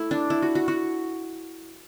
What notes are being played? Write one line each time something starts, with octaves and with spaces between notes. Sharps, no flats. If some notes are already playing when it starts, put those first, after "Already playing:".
Already playing: A3 E4
D4
E4
F#4
F#4
F#4